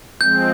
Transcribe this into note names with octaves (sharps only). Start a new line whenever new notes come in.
F3 G#3 C4 G6